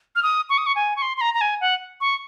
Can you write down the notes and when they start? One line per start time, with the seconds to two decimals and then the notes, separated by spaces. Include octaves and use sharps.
0.16 F6
0.23 D#6
0.49 C#6
0.58 D#6
0.66 C#6
0.76 G#5
0.96 C#6
1.02 C6
1.17 C6
1.21 A#5
1.34 A#5
1.41 G#5
1.61 F#5
2.01 C#6